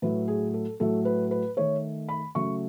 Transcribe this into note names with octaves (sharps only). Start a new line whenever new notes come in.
A2 F#3 A3 B4
G#4
A4
A2 F#3 A3 A4
B4
B4
D#3 A3 C#5
B5
C#3 F#3 A3 C#6